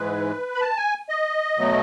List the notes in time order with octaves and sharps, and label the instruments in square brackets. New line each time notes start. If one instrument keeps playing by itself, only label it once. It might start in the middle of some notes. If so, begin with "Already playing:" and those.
Already playing: [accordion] G#2 E3 G#3 B4
B5
A5
G#5
D#5
B2 F#3 A3